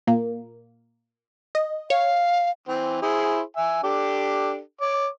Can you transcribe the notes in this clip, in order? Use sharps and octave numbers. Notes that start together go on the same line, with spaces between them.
A#2 A#3
D#5
C#5 F5
E3 C4
E4 G#4 C5
E5 G#5
D4 G4 A4
C#5 D6